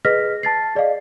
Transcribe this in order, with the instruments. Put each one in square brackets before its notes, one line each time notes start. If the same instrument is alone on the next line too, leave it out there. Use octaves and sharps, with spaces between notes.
[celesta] G#4 B4 D#5 F6 A#6 B6
A5 A6 C7
G#4 D5 D#5 F5